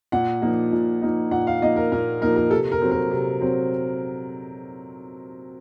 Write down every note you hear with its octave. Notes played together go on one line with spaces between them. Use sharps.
A#2 F#5
F3 A#3 D#4
A#2
F3 A#3 D#4
A#2 F#5
F5
F3 A#3 D#4 D#5
A#4
A#2 A#4
F3 A#3 D#4 A#4
A#4
C3 A4
A#4
F#3 C4
A#4
C3
F#3 C4